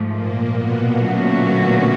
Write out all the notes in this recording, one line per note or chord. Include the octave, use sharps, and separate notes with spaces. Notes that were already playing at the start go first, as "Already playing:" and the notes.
Already playing: G#2 F3 A3
A#2 A#3
B2 B3
D3 F#3 A3 C#4 F#4